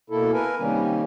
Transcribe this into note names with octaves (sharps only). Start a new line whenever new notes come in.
B2 A#3 E4 A4
A#4 B4 G#5
C3 D#3 G3 A#3 C#4